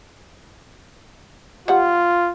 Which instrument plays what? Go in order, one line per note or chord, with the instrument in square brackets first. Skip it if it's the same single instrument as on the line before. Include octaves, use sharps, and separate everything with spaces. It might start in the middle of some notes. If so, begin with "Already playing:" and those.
[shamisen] G3 F#5 [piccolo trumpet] F4